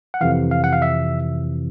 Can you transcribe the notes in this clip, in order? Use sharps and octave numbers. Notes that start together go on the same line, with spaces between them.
F#5
F2 C3 E3 F5
F5
F#5
F5
E5